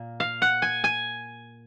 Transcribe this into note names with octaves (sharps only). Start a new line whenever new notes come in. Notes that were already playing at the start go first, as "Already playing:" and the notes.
Already playing: A#2 A#3
F5
F#5
G#5
G#5